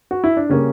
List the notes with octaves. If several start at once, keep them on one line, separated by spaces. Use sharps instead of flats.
F#4
E4
D4
C#3 G3 A#3 C#4